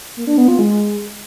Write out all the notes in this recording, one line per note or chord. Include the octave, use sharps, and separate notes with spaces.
A#3
D4
B3
F4
G#3